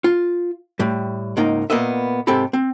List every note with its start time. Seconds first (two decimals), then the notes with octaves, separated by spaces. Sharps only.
0.04 F4
0.79 A2 G3
1.37 C#2 G#2 A#3 D#4
1.70 A#2 A#3 B3 B4 D#5 E5
2.27 G#2 C3 C4 G4 A4 B5
2.53 C4